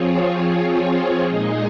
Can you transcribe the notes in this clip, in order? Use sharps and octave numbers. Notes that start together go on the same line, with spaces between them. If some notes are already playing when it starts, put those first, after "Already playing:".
Already playing: F3 C4 F4 G#4 C#5
A#2 G#3 D#4 G#4 D#5